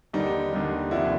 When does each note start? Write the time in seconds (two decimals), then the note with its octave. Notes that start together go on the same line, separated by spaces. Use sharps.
0.13 D#2 D3 G3 D#4
0.53 D#2 D3 G3
0.91 F1 D#2 D3 F3 E4